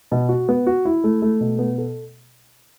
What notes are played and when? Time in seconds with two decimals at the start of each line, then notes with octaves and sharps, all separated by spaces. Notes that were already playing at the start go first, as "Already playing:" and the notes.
0.12 B2
0.29 F#4
0.49 B3
0.67 F#4
0.85 E4
1.04 A3
1.22 A3
1.41 B2
1.59 B3
1.78 A4